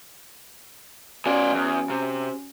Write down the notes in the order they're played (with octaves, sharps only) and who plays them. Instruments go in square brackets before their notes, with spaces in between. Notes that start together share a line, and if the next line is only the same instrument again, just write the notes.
[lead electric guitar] B2 D5 [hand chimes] C#4 F#4 G#5
[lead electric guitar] E2
C3